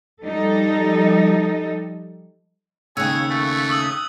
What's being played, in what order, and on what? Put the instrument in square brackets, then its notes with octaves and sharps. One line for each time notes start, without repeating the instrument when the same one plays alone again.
[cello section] F3 G3 D#4 A4
[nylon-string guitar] D#2 C#3 [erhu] G#4 [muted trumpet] C#5 [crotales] E6 F#6 G#6
[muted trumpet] A3 [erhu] C#6
[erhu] D#6 [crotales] E6 F#7